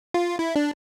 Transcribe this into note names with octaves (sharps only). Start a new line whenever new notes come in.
F4
E4
D4